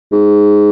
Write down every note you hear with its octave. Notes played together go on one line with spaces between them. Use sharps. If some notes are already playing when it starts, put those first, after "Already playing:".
G#2